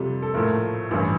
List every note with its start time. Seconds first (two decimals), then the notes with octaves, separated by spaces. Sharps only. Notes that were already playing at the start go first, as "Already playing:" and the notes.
Already playing: F2 C3 G3 A4
0.22 A4
0.34 A#1 A2 F3 A3 A#4
0.91 A1 G2 E3